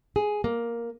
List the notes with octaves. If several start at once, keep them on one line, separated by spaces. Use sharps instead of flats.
G#4
A#3